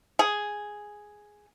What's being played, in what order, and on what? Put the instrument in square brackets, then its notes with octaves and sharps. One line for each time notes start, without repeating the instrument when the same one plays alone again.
[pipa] G#4